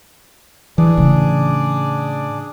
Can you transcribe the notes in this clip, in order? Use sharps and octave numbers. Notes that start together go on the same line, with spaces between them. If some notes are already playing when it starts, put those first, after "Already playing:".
E3 D4 G#4 D5
A2 C#3